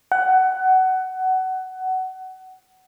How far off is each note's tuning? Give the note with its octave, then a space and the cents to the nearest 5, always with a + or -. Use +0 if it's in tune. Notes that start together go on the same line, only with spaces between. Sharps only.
F#5 +20